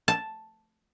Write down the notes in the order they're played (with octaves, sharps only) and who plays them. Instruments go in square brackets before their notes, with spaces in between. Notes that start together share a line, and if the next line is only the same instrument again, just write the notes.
[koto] A5